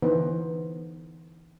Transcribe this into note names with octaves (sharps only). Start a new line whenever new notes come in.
D3 E3 B3 D#4 B4 C5